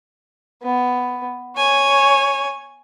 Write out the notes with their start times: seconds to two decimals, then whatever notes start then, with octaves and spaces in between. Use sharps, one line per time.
0.62 B3
1.57 C#5 G#5